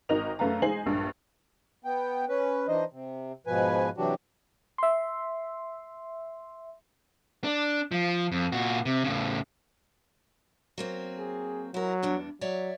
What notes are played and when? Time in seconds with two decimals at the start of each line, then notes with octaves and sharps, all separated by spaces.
0.09 G#1 D#4 F#4 A#4 D#5 F7
0.39 F#2 A3 B4 F5 A#5
0.62 G#3 D#4 C5 G#5 C7 F#7
0.86 A#1 G2
1.85 B3 G5
2.29 C#4 B4
2.68 E3 D4 D#4 C5 D#5
2.92 C3
3.47 G#2 B2 F3 B4 G#5
3.97 C3 E3 F#3 D4 F#4 G4
4.78 E5 C6
7.44 D4
7.92 F3
8.32 F2
8.52 A#2 F#4
8.85 C3
9.04 A2 C#3
10.78 F#3 A#3 C4
11.19 G#4
11.74 F#3 E4 A#4
12.03 E2 G2 D4
12.41 F#3 C#5 D5 E5